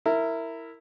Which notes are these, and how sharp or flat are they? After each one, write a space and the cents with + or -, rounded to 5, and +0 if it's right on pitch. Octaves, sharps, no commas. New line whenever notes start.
E4 +0 A#4 -20